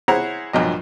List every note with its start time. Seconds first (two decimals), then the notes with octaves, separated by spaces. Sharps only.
0.08 E4 G#4 C5 C#5 F#5 A#5
0.53 A#1 G2 F#3 D#5